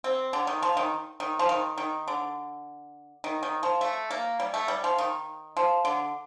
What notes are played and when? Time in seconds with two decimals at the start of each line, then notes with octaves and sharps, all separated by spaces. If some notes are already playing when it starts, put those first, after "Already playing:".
0.04 C4
0.33 D3
0.47 D#3
0.62 F3
0.77 D#3
1.20 D#3
1.39 F3
1.49 D#3
1.78 D#3
2.08 D3
3.24 D#3
3.43 D#3
3.63 F3
3.81 A3
4.11 A#3
4.40 G3
4.54 A3
4.68 G3
4.84 F3
4.98 D#3
5.57 F3
5.85 D3